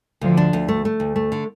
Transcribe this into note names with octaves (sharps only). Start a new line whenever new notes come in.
D2 D3 F3
D4
D2
A3
A3
D2
A3
D3